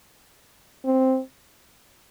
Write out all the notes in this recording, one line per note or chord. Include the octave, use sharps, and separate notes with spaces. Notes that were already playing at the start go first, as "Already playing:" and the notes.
C4